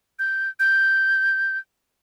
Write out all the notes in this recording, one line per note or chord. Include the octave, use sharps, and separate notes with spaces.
G6
G6